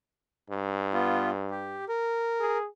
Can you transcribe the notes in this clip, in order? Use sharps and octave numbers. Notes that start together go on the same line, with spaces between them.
G2
B3 F4
G4
A#4
G#4